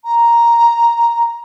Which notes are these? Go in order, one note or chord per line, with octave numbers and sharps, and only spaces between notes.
A#5